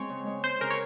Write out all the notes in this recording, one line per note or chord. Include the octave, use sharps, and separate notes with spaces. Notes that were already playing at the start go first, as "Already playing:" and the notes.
Already playing: G#3 C4 C#5
C#3
G#3
C4 C5
C#3 A#4
C#5